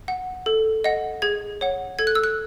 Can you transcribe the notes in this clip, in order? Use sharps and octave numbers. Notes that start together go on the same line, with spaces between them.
F#5
A4
D#5 F#5
G#4 G#6
C#5 F#5
A4 G#6
F#6
E6
F#6